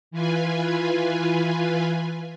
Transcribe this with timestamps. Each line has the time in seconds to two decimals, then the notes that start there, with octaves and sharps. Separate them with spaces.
0.11 E3 F4 B4 G#5